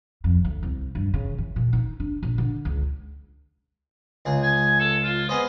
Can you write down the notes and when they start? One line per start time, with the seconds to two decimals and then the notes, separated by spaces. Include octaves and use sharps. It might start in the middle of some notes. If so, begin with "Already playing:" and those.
0.24 F2
0.44 D2
0.63 C2
0.95 G2
1.14 C#3
1.38 E3
1.56 A#2
1.73 D#4
2.00 D4
2.23 A#1
2.38 D3
2.65 C#2
4.26 C#2 G#4
4.43 G#5
4.80 A4
5.04 F4
5.29 B3 G#4 C5 D#5